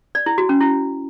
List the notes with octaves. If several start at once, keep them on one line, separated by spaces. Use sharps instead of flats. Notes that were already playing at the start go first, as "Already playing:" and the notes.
D5
E4
F#4
C#4
E4